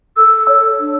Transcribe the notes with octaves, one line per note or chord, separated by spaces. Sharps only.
A4 E6
C#5
D4